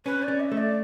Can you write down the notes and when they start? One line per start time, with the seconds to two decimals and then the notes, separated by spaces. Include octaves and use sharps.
0.05 C#4 B4
0.23 D5
0.28 C#4
0.40 E5
0.52 A3
0.57 D5